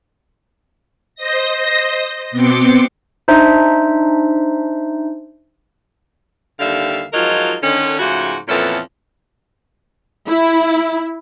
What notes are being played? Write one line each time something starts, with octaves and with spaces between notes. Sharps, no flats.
C5 D#5 A#6
B2 B3 C4 C6 D6 C#7
D4 D#4 C5 E5
D#2 D3 G3 E5 F5
F3 F#3 G#3 D#4 F4 A#4
D3 D#3 C#4
G#2 C#3 F3 A3 F#4
F2 A#2 E3 B3 C#4 A4
E4